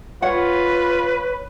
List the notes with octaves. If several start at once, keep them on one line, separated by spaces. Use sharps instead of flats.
F4 B4 C#5 F#5